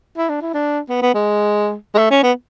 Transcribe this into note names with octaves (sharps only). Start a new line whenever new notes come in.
E4
D4
E4
D4
B3
B3
G#3
G#3
A3
C#4
B3